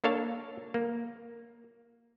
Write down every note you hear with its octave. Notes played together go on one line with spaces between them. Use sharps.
A#3 D4 A4 C#5 F5 A5
A#3